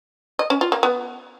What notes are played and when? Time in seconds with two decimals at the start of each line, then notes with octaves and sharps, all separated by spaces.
0.39 D#5
0.50 C#4
0.61 F4
0.72 A#3
0.83 B3